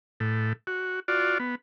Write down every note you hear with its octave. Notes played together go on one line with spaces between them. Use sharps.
A2
F#4
F4 F#4 D5
B3